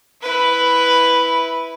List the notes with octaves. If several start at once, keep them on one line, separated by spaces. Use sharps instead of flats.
E4 B4